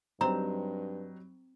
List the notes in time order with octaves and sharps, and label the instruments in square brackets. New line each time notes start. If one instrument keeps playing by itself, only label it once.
[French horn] G2 [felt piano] F#3 G3 D#4 [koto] C4 [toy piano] A#5